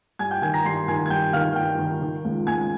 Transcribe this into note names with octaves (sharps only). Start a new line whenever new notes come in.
G2 G#5 G#6
G5 G6
D#3 G#5 G#6
A#5 A#6
G2 C6 C7
D#3 G#5 G#6
G#6
G2 G5 G6
D#3 F5 F6
G2 G5 G6
D#3
D#3
C#2
C#2 G#5 G#6